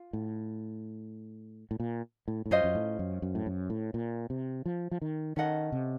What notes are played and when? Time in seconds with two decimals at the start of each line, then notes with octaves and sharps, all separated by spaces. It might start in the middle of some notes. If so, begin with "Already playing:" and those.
Already playing: F4
0.13 A2
1.71 A2
1.80 A#2
2.28 A2
2.46 A2
2.51 F#2 C#4 F4 C5 D#5
2.64 F#2
2.75 A2
2.99 F#2
3.22 F#2
3.35 A2
3.46 F#2
3.70 A2
3.94 A#2
4.30 C3
4.66 F3
4.91 F3
5.02 D#3
5.36 D#3 C#4 A4 D#5 F#5
5.72 C3